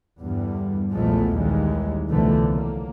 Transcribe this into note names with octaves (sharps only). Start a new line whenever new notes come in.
E2 G2 D3 G3
B1 E2 A#2 F3 G#3 A3
D#2 E3 G3 G#3
C2 B2 D3 E3 F3 A3
F#3 A#3